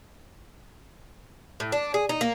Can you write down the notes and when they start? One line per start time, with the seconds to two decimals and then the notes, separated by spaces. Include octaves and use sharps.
1.60 A2
1.72 D4
1.94 G#4
2.09 D#4
2.21 A#3